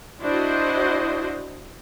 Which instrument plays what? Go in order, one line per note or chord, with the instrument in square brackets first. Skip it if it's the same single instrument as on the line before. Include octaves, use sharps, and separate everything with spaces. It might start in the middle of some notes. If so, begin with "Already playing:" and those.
[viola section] D4 E4 F#4 C5 D#5